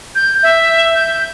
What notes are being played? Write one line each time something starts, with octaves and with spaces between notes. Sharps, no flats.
G6
E5
G6